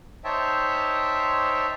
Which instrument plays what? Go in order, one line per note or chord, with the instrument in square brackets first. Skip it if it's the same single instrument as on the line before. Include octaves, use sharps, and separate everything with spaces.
[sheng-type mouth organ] D#4 C5 C#5 E5 G5 A5